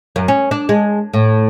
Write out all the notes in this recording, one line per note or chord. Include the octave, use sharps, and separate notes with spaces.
F#2
C#4
D4
G#3
A2